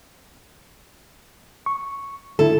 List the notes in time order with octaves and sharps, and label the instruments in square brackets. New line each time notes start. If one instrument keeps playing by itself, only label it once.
[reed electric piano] C#6
[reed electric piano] D3 E4 [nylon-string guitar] A4